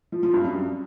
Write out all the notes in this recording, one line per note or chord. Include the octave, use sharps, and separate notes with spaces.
F3
F3
G2
F#2